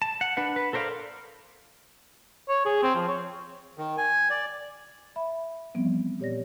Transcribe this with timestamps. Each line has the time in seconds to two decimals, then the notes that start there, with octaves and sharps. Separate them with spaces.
0.02 A5
0.21 F#5
0.37 D4 B4 F#5
0.56 B4
0.73 A4 A#4 C5 D5 F5
2.49 C#5
2.65 G#4
2.83 C4
2.95 F3
3.08 C#5
3.78 D#3
3.98 G#5
4.30 D5
5.16 E5 B5
5.75 E3 F3 G3 B3 C4
6.20 A#2 G4 C#5 D5 A#6